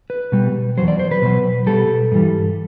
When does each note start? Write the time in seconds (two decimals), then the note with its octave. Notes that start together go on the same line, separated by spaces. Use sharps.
0.10 B4
0.32 B2 G3
0.77 E2 B2 F#3 C5
0.88 D5
0.99 C5
1.11 B4
1.22 B2 F#3
1.67 B2 G3 A4
2.12 G2 E3 G3